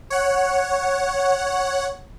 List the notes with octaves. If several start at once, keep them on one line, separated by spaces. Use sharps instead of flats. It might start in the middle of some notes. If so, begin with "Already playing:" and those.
C#5 F#5